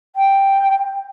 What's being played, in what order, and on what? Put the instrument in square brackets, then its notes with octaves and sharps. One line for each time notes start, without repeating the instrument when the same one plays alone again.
[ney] G5